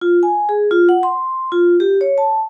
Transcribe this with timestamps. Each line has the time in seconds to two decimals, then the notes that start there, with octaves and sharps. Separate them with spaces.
0.01 F4
0.23 G#5
0.49 G#4
0.71 F4
0.89 F#5
1.03 C6
1.52 F4
1.80 G4
2.01 C#5
2.18 A5